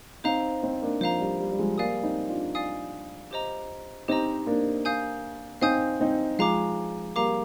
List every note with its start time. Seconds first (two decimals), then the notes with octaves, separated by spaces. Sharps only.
0.24 C4 D#4 C5 F5 A#5
0.62 C4 D#4
0.82 A#3 D4
1.01 F3 C5 F5 A#5
1.20 G3
1.39 G3
1.51 G3
1.59 F3 G#3
1.78 G3 A#3 D5 F5 G#5 D#6
2.03 C4 D#4
2.29 D4 F4
2.55 D5 F5 G#5 D#6
3.31 G4 C5 D#5 A#5
4.08 C4 D#4 G4 C5 D#5 A#5
4.46 A#3 D4
4.85 F5 G#5 D#6 G6
5.61 C4 D#4 F5 G#5 D#6 G6
6.00 C4 D#4
6.39 F3 G#3 F5 A#5 D6
7.16 G3 A#3 F5 A#5 D6